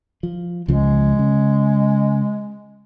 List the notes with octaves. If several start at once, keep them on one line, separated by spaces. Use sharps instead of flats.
F3
C#2 C#3 F3 G#3
C#3